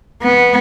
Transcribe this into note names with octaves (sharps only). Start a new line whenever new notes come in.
B3